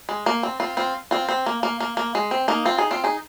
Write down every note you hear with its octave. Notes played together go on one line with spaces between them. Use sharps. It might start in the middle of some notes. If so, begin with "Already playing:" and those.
G#3
A#3
C4
C4 F4
C4 F4
C4 F4
C4
A#3
A#3
A#3
A#3
G#3
C4
A#3 D#4
C4 F4
D#4 G#4
C4 F4
D#4 G#4